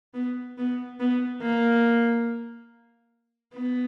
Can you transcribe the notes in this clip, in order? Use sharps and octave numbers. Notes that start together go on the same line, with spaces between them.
B3
B3
B3
A#3
B3